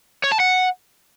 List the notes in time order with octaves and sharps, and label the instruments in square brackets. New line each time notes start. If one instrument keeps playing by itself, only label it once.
[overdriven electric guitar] C#5
A5
F#5